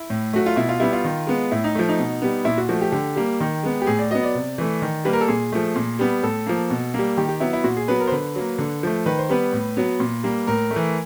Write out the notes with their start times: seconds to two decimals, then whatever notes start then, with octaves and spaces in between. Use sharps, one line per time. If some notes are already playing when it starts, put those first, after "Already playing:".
Already playing: E4
0.10 A2
0.33 F#3 A3 F#4
0.46 F4
0.56 B2 E4
0.69 F4
0.80 G3 B3 E4
0.93 F4
1.05 D#3
1.27 G#3 B3
1.51 A2 E4
1.64 D#4
1.75 F3 A3
1.89 D#4
1.99 B2
2.22 G3 B3
2.45 A#2 E4
2.58 F#4
2.69 F3 A3 F#4
2.81 G4
2.92 D3 G4
3.16 G3 A#3
3.40 D#3
3.63 G#3 B3
3.82 G4
3.87 A2 G#4
3.99 D5
4.11 F#3 B3 D#5
4.23 D5
4.35 C3
4.58 E3 A3
4.82 D#3
5.05 G3 A#3 B4
5.13 A#4
5.21 A4
5.28 A#2 G#4
5.52 F3 A3
5.76 A#2
5.99 G3 B3
6.23 A2 A4
6.47 F3 A#3
6.70 B2
6.94 G3 A#3
7.17 D#3 G4
7.29 G4
7.40 F#3 B3 E4
7.53 E4
7.64 A#2 F#4
7.77 G#4
7.88 F#3 B3 B4
8.00 A#4
8.08 C5
8.11 D3 B4
8.36 F#3 A#3
8.59 D3
8.83 F3 A3
9.06 D#3 B4
9.19 C5
9.29 G3 B3 B4
9.53 A2
9.77 F#3 B3
10.00 A#2
10.23 G3 A#3
10.47 A2 A#4
10.71 A3
10.76 E3